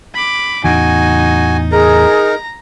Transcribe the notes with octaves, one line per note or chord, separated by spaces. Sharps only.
B5 D6
E2 A2 C#3 D#4 F#4 G#5
D#4 G#4 A#4 A#5